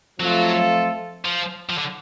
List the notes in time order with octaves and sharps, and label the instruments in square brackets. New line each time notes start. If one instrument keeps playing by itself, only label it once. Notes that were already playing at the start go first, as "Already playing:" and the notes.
[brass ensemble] F2 F3 A3 F4 A4 [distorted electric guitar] F#3
[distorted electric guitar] F3
F3
D3